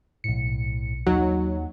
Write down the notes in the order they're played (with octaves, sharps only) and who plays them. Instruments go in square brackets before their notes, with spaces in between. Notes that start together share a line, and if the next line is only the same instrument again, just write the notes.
[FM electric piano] B1 C#7 [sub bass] A2
[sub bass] D#2 [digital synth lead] F#3 [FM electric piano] D#4 F#4